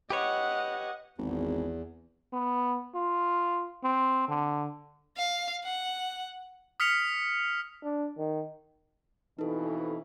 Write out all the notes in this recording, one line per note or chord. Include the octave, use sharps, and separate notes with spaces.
G4 B4 C#5 D#5 F#5
G#1 E2
B3
F4
C4
D3
F5
F#5
D#6 F6 B6 C#7 F7
D4
D#3
F2 B2 E3 D#4 A4